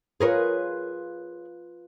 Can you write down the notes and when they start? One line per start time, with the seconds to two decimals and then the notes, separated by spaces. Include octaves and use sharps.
0.20 F4 G#4 A#4 B4 C#5